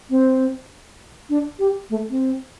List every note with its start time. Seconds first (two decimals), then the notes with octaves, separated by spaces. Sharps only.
0.10 C4
1.30 D4
1.59 G4
1.90 A3
2.10 C4